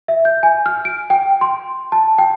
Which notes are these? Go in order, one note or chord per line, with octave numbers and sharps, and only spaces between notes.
E5
G6
G#5
F6
D7
G5
C6
A5
G5